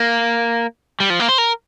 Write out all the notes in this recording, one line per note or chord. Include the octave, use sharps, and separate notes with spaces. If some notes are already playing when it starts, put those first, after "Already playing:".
Already playing: A#3
G3
F3
A#3
C5
A#4